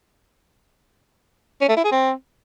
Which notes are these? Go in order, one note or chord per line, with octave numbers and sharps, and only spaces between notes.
C#4
A3
E4
G#4
C4